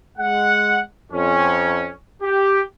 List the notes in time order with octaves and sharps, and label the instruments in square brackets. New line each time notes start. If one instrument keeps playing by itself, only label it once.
[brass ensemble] G#3 F#5
F2 C#4
G4